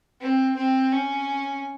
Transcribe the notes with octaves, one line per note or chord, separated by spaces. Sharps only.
C4
C4
C#4